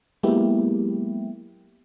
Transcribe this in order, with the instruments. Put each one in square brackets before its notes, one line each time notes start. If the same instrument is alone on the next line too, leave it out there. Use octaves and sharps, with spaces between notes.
[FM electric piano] F#3 G#3 A#3 B3 E4 G4